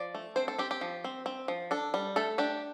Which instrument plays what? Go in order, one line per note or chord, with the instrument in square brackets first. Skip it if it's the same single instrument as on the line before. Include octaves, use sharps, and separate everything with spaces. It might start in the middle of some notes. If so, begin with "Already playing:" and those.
Already playing: [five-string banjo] F3 D5
A3
C4 C5
A4
C4 G4
G4
F3
C4
C4
F3
D4 A4
G3
A3 A4
D4 G4